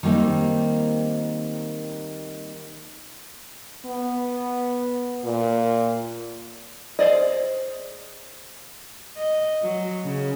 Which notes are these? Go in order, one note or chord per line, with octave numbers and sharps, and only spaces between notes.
D#3 G3 A#3 C4 D#4
B3
A#2
G#4 C5 D5 D#5
D#5
F#3
C#3